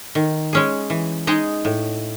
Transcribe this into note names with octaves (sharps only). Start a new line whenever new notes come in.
D#3
G#3 C#4 G#4
E3
G#3 D#4 G#4
A2